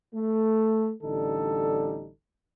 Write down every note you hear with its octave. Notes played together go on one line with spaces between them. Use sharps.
A3
A1 D3 G3 D#4 A4